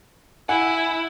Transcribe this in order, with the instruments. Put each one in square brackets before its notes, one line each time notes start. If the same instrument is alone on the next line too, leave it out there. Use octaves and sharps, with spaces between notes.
[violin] E4 [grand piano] F#5 G#5